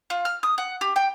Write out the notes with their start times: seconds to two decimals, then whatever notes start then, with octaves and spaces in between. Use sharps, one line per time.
0.10 F4
0.25 F6
0.43 D#6
0.58 F#5
0.81 G4
0.96 G5